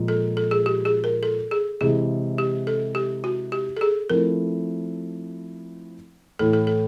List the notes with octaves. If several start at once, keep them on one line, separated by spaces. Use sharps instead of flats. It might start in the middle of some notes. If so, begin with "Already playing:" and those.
Already playing: A#2 F3 G#3
A4
A4
G#4
G4
G#4
A#4
A4
G#4
C3 E3 G#3 G#4
G4
A4
G4
F#4
G4
A4
G#4
F3 A3 C4 E4 A#4
A2 E3 A3 A4
A4
A4